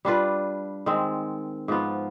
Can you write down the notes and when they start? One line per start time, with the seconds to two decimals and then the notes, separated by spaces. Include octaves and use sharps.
0.05 G3 D4 F4 B4
0.86 D#3 G#3 C4
1.68 G#2 F3 B3 F4